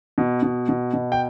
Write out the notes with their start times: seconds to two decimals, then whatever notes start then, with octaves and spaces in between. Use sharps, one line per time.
0.18 B2
0.43 B2
0.69 B2
0.94 B2
1.12 G5